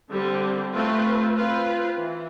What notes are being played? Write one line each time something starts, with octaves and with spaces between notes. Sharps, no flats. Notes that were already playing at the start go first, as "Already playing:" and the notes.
D3 G3 C4
A3 C4 F4 B4
C4 F4 B4
E3